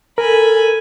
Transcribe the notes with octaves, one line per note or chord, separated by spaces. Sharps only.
A4 A#4 G#5 B5